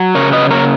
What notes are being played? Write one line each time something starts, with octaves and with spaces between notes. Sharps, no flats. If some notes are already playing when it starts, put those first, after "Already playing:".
Already playing: F#3
C#3 A#4 C#5
B4 D#5
A#3 A#4 C#5